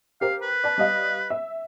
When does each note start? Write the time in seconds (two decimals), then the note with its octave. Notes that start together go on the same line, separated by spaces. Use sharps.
0.21 G4 A#4 C5 F5
0.42 B4
0.64 D5 A5
0.78 G3 D#5 F5
1.30 E5